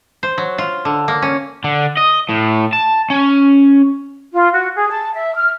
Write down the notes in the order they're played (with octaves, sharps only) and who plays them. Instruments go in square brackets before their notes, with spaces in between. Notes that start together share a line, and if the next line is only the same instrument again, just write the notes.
[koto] C5
F#3
F4
D3
A#3
C#4
[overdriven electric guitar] D3
D#5
A2
A5
C#4
[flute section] F4
F#4
G#4
A5
E5
F6